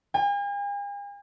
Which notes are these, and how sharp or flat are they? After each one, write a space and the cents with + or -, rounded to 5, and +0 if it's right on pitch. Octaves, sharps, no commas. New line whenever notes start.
G#5 -45